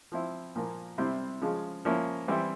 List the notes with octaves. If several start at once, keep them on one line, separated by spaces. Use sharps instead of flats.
F3 C4 E4
A#2 F3 A#3
C3 G3 C4 E4
C#3 F3 G#3
F3 A#3 C#4 E4
E3 G3 C4 E4